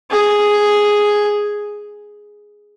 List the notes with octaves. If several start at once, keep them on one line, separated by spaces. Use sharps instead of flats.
G#4